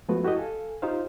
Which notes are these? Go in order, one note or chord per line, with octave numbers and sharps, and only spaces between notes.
F3 G#3 A3 B3 F#4 B4
E4 F#4 G4 A4 D#5
A4 F5 G#5
D#4 F4 G4 C5 F5